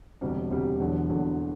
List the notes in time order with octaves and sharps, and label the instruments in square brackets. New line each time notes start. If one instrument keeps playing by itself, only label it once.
[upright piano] E1 D2 C3 G3
E1 D2 C3 G3
E1 E2 D3 F#3
E1 E2 D3 F#3